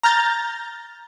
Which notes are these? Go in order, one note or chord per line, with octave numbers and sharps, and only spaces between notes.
A#5 F6 G6 A6